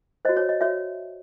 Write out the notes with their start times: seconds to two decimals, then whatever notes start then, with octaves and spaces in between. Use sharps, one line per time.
0.25 C5 D#5
0.29 F#4
0.37 C#5
0.49 D#5
0.61 F#4 C#5 E5